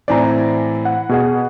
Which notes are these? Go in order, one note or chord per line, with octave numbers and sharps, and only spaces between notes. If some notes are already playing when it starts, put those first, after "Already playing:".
A2 E3 C4 D5 G#5 A#5
F#5
B2 G#4 F#5